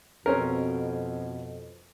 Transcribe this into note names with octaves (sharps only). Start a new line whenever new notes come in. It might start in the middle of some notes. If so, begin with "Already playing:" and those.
F2 B2 C4 C#4 A#4